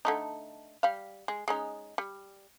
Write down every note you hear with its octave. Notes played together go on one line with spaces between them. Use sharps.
D3 A3 D#4
G3 F5
G#3
G#3 C#4 D#4
G3